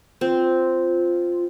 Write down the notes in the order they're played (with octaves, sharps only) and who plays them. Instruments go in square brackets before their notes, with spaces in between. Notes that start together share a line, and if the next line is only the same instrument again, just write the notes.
[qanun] C4 [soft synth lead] F4